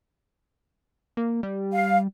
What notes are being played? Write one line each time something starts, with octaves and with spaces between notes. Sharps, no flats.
A#3
G3
F5